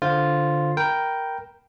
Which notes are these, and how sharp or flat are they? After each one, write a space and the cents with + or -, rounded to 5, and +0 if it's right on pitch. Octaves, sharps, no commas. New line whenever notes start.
D3 +0 F4 +0 C5 +0
A#4 +0 G5 -5 B5 +0